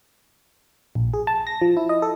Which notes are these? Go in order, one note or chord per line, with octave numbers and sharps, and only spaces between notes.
A#1
G#4
A5
A#6
F3
E4
D#5
A4